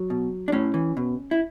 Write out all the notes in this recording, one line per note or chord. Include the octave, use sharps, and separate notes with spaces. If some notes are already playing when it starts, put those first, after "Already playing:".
Already playing: F#3
B2
D4
A2 C#4
E3
B2
E4